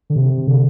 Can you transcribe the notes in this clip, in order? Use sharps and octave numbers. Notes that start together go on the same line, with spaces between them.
D3
C3
D3